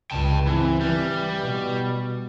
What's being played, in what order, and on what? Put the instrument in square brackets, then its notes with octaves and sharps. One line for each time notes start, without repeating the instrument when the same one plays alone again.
[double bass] C#2 G2 [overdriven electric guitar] G5 A5
[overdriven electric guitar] E3 [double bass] C4
[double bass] E3 [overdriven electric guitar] G3
[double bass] B2